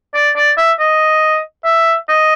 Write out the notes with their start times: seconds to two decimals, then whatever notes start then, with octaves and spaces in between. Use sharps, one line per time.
0.15 D5
0.36 D5
0.57 E5
0.80 D#5
1.65 E5
2.09 D#5